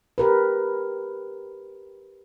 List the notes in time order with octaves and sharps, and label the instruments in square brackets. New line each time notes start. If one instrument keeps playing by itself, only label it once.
[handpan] G4 A#4 B4